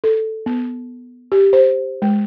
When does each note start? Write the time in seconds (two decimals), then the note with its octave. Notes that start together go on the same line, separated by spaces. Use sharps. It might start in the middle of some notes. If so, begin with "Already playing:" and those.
0.04 A4
0.46 B3
1.32 G4
1.53 C5
2.02 G#3